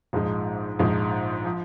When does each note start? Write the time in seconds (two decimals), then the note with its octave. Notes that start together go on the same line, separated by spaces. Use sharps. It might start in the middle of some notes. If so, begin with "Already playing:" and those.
0.13 A#1 G#2 F3 G#3 D#4
0.79 A#1 G#2 F3 G#3 D#4
1.45 F3